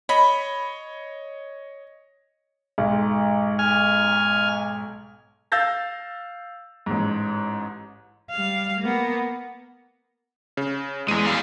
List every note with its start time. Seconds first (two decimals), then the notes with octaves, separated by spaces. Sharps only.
0.09 C#5 D#5 B5
2.78 B1 G#2
3.59 G#5 F6
5.52 F5 E6 G6 A6 A#6
6.86 A1 G#2
8.31 G3 F5
8.81 A#3 B3
10.57 C#3
11.08 E2 G#3 D#7
11.25 G3 F5